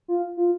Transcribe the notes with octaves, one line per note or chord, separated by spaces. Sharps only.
F4
F4